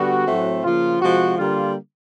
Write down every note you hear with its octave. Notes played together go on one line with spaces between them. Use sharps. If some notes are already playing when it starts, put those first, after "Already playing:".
Already playing: D3 G3 B3 F#4
A2 F#3 A3 C4
C#3 F3 A#3 F4
C3 F3 G#3 F#4
D3 G3 A#3 F4